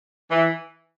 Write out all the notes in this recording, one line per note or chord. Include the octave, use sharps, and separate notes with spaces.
E3